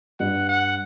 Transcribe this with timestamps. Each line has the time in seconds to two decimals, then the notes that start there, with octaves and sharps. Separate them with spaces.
0.20 G2 F#5
0.49 F#5